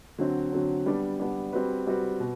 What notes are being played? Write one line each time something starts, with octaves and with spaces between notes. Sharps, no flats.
D3 F#3 C4
D3 F#3 C4
G3 B3 D4
G3 B3 D4
G3 C4 F#4 B4
G3 C4 F#4 B4
B2